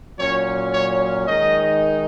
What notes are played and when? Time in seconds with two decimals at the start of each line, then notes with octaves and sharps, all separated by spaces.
0.19 A#2 F#3 C#4 C#5
0.73 C#5
1.27 D#3 G#3 D#4 D#5